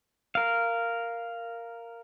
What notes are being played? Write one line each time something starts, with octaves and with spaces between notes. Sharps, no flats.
A#4 F5